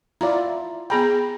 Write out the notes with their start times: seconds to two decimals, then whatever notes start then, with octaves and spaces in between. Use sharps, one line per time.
0.21 E4 F4 D5 A#5
0.90 B3 G#4 G5 A#5 B5